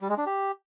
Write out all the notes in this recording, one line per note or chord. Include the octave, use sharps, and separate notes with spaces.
G3
G#3
D4
G4